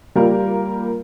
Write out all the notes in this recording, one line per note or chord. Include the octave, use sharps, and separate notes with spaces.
G3 A#3 F4 A#4